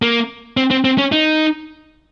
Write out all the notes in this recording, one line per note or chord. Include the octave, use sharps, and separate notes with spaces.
A#3
C4
C4
C4
C#4
D#4